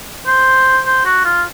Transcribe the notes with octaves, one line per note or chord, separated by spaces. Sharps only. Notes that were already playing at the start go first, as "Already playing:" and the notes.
C5
C5
F#4
F4